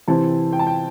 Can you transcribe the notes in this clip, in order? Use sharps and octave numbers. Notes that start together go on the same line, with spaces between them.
C3 E3 C4 E4 A5
G5
A5
G5